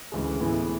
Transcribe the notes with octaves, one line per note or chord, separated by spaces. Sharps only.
D2 C#3 E3 G#3
A2 E3 B3 E4 G#4